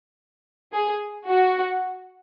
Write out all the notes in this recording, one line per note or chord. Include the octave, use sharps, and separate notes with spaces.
G#4
F#4